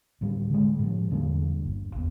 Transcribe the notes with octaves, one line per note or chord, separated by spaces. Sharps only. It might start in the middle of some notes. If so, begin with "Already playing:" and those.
D2 A2 G3
D3 G#3
A2 F3
E2 D3 G3 A#3
G1
D#2 B3